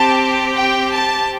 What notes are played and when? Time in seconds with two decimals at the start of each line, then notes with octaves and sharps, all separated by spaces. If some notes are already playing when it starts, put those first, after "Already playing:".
Already playing: C4 G4 A5
0.54 G5
0.91 A5